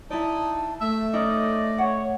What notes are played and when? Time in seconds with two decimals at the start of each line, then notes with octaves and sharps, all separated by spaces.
0.10 D#4 E4 D5 A5
0.81 A3 E5
1.13 C#4 D#4 D5 D#5
1.78 C#5 F#5